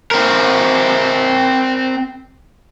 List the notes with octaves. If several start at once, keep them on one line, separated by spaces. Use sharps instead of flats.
C4 A#4